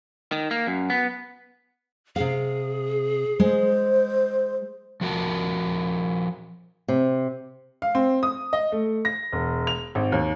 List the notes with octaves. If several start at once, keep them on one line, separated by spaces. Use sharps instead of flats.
D#3
A#3
F#2
B3
C3 G#4 F5
G#3 C5
F3 F#4 A#4 A5
C3
F5
C4
D#6
D#5
A3
A#6
E1
F7
G#1
D#2